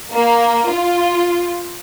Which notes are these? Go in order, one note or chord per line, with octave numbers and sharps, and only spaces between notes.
A#3
F4